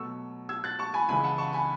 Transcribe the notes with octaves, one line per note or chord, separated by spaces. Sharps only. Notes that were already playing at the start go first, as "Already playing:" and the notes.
Already playing: B2 F#3 A3 C#6 E6
E6 G#6
F#6 A6
A5 C#6
G#5 B5
C#2 C#3 E3 G#5 B5
F#5 A5
A5 C#6
G#5 B5